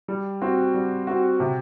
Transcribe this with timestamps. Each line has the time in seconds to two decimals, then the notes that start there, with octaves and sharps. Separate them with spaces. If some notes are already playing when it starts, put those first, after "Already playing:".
0.08 G3
0.42 C4 F#4
0.74 G3
1.07 C4 F#4
1.40 C3